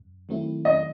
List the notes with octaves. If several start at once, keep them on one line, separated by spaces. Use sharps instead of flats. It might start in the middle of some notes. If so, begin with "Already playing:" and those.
Already playing: F#2
D#3 F#3 A3 C4 E4
D#5